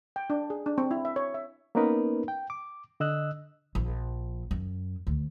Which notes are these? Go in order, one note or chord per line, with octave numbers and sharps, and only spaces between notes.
G5
D4
G#4
D4
C4
E4
E5
C#5
E5
A#3 B3 C#4 D#4 A#4 B4
G5
D6
D3 D#5 E6 F#6
A#1
F#2
D2